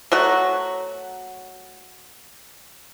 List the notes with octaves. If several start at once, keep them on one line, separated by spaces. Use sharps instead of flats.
F#3 A3 F#4